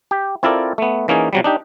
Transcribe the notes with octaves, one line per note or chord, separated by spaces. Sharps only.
G4
C4 E4 F4 A4 A#4 D5
A3 B3
E3 A#3 C#4 D#4 G#4
C3 F#3 G3
D4 D#4 G4